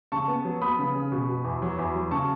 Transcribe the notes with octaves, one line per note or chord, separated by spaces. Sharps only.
C#3 A5 C#6
B3
F#3
B3 B5 D#6
C#3
C#3
B2
B2
E2
F#3
E2
F#3
C#3 A5 C#6